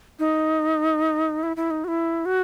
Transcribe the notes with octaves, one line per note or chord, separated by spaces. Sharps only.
D#4
E4
E4
D#4
F#4
E4
F#4